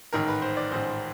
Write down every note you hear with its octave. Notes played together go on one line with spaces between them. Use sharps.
A1 G#2 D#3 A#4
B4
C5
D5
A1 G#2 D#3 C5